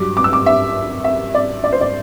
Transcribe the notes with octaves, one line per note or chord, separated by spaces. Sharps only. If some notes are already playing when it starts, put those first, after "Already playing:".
Already playing: G2 F#3 D6
D6
E6
D6
E5
E5
D5
D5
C5
D5